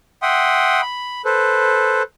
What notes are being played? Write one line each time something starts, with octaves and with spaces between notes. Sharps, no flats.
E5 F#5 G5 C6 D#6
B5
A4 B4 C5